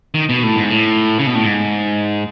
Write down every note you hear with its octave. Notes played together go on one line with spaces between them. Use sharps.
D#3
B2
A2
G#2
A2
C#3
B2
A2
G#2